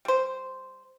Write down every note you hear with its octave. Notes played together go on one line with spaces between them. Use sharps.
G3 C5